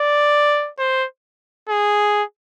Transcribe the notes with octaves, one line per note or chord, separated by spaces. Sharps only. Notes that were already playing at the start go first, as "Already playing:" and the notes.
Already playing: D5
C5
G#4